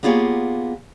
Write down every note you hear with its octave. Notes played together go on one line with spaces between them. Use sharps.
A#3 B3 F4 G4 G#4 C#5